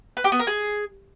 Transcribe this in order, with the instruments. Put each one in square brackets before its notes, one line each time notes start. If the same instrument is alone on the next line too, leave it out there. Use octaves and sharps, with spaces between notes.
[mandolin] B4
G4
B3
A#4
G#4